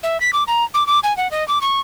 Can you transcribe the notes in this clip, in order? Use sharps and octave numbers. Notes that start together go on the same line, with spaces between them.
E5
B6
D6
A#5
D6
D6
G#5
F#5
D#5
D6
C#6